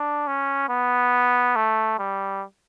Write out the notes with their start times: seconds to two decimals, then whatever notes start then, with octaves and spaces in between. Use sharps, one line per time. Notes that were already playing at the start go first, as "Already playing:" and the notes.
Already playing: D4
0.27 C#4
0.69 B3
1.56 A3
1.99 G3